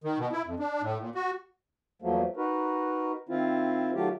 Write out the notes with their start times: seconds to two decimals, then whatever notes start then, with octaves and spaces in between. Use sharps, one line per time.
0.04 D#3
0.18 B2
0.32 E4
0.46 F2
0.59 D4
0.82 A2
1.00 A#2
1.15 F#4
2.02 E2 F3 F#3 A3 A#3
2.37 D#4 F#4 A#4 B4
3.29 D#3 C4 E4 F4
3.94 D#3 F#3 A3 F4 G4